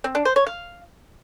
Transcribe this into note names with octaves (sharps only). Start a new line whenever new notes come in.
C4
D4
C5
C#5
F5